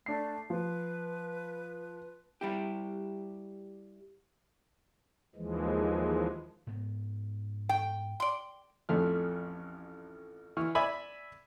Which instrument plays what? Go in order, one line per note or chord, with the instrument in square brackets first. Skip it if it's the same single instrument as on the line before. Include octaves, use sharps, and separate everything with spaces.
[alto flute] A3 [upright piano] D4 C7
[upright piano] F3 [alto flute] B4
[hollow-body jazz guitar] G3 E4 G4
[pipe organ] D#2 E3 F3 G#3
[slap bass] G#2 B3
[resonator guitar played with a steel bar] G5
[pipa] D5 C6
[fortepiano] A1 F2 A3 F6
E3 C#6 F6
D5 E5 G#5 B5